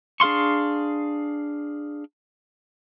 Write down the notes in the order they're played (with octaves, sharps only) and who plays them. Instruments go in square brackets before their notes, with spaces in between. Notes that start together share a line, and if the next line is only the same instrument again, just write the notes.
[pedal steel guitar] D4 G#4 F5 C6 C#6